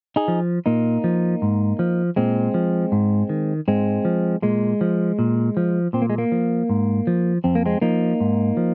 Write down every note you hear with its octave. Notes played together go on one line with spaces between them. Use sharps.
D#4 G#4
F3
A#2 A#3 D#4
F3
G#2
F3
A#2 G#3 C4
F3
G#2
D#3
G#2 G#3 C4
F3
A#2 G#3
F3
A#2
F3
A#2 C4
A#3
G#3
A#3
F3
G#2
F3
F2 C4
A#3
G#3 C4
F3 A#3 D#4
G#2
F3